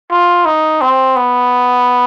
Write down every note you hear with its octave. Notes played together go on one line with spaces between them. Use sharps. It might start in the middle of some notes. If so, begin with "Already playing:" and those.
F4
D#4
C4
B3